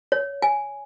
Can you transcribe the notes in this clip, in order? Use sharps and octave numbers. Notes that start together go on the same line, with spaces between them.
C#5
G#5